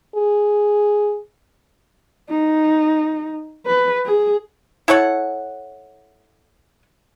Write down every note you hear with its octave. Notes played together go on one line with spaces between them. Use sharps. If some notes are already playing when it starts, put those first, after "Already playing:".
G#4
D#4
B4
G#4
E4 A4 C#5 F#5